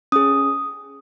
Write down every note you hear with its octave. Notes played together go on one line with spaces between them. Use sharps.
C#4 G#4 D#6